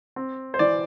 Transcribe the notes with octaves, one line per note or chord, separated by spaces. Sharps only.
C4
C5
E3 D5